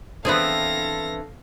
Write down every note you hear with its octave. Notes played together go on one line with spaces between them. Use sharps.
E3 B3 C4 D4 G#4 A4 F5 A#6